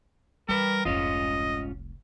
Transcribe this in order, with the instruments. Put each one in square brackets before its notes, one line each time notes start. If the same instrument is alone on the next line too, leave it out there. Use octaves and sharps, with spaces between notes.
[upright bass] E3 [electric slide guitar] G3 B4 [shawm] A#4
[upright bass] F1 C2 [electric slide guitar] G#2 C#4 F4 [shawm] D#5